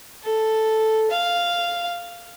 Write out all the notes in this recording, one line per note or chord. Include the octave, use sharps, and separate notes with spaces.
A4
F5